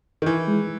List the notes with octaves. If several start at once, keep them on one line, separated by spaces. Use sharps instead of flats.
D#3
E3 E4
G#3